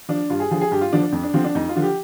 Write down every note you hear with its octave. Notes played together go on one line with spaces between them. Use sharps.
F3 D4
G2 F4
G#4
D3 F3 G#4
G#4
G2 G4
F4
D3 F3 D4
D4
F2
D4
D3 F3 C4
D4
F2 D#4
F4
D3 F3
G4